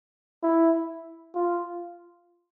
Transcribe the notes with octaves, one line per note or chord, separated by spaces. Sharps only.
E4
F4